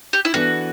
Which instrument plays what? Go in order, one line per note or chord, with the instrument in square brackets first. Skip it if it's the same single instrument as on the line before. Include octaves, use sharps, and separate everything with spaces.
[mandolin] G4
E4
[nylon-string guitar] E3 B3 D4 A4 [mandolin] F#4